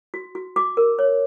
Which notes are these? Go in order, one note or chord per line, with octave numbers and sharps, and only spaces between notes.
F#4
F#4
F#4 D6
A#4
C#5